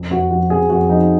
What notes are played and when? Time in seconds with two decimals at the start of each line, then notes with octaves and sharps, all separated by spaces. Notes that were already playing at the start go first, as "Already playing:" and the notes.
Already playing: F2
0.11 F2 F#4
0.31 F3 F#4
0.50 F2 G#4
0.69 F2 F#4
0.89 F3 D#4